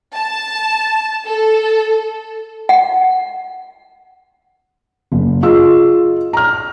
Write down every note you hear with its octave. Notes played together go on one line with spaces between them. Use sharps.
A5
A4
F#5
F#1
F4 G#4 D#5 E6
A#5 F6